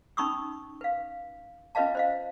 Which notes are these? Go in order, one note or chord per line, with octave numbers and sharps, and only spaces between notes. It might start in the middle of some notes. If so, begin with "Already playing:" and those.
C#4 D#4 B5 C#6 D#6 E6
B4 F5
C#4 F4 B4 D#5 F5 A5
C5 D#5 F5